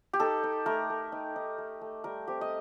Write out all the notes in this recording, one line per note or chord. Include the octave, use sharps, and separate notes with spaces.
G4
D#4 A4
D#4
A3 A#4
A3
D#4
D#4
A3
A3
G3 A#4
C4 G4
D#5